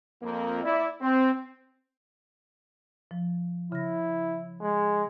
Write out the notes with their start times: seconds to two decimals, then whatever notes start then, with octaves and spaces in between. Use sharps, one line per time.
0.22 F2 A#3
0.63 E4 D5
1.01 C4
3.11 F3
3.72 C#3 E4 A#6
4.62 G#3